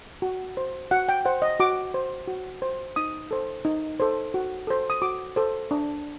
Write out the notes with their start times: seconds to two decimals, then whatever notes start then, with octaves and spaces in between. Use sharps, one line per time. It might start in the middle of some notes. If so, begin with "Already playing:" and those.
0.22 F#4
0.57 C5
0.91 F#4 F#5
1.09 G5
1.25 C5 F#5
1.42 D#5
1.60 F#4 D6
1.94 C5
2.28 F#4
2.62 C5
2.96 D#4 D#6
3.31 A4 C5
3.65 D#4
4.00 A4 C5
4.34 F#4
4.67 A4 C5
4.90 D#6
5.02 F#4 D6
5.36 A4 C5
5.71 D4